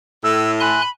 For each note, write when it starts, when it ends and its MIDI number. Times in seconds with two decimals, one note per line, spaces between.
0.24 0.76 45
0.24 0.51 88
0.60 0.81 80
0.60 0.89 83
0.60 0.81 84
0.60 0.81 90